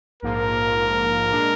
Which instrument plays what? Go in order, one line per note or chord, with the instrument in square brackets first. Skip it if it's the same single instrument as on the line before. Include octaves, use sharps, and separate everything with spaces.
[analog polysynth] A#1 G#2 F3 A#3 F4 [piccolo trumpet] A#4
[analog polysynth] A#2 G#3 D4